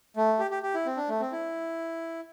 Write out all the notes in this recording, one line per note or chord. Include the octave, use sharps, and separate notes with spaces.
A3
G4
G4
G4
E4
C4
D4
A3
C4
E4